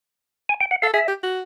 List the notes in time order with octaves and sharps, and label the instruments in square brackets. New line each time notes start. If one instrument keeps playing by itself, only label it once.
[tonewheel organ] G#5
G5
F#5
[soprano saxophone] A4 [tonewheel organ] F5
[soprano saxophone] G#4 [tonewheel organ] E5
[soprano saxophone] G4
F#4